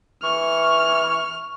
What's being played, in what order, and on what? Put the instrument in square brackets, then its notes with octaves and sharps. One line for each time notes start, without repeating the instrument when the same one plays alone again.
[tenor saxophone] E3 [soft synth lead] C#6 [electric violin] F6